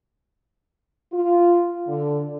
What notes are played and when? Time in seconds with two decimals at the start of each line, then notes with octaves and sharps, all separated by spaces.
1.13 F4
1.87 D3